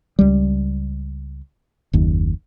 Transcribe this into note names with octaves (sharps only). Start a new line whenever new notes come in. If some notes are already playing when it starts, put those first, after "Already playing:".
C#2 G3
F#1 D#2